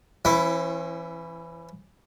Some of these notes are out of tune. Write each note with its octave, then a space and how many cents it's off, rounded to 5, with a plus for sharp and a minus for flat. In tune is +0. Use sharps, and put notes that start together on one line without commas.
E3 +25 C#4 -40 E4 +0